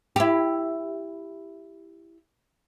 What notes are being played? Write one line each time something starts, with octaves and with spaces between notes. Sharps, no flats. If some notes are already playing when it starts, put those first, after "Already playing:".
E4 G4